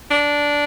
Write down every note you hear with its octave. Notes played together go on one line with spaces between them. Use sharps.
D4